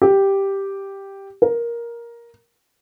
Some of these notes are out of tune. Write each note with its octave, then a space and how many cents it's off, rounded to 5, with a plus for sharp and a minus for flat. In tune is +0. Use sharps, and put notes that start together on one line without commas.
G4 +0
A#4 +10